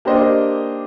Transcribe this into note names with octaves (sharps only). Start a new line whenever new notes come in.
A#3 D4 G4 C5 D#5